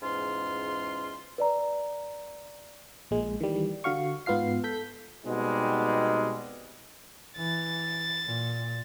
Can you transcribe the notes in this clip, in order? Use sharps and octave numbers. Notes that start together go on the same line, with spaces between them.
E2 G#2 C#4 F4 C6
B4 D5 A#5
A#1 A#2 G#3
D#3 E3 G3
D3 F#4 F5 C#6
G#2 B3 F4 F5 C7
A4 G6 B6
B2 G3 G#3 C4 D#4
E3 A6
A#2